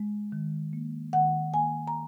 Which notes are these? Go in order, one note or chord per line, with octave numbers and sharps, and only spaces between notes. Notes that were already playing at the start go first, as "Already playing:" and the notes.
Already playing: G#3
D#3
A#3
D#3 F#5
A#3 G#5
A#5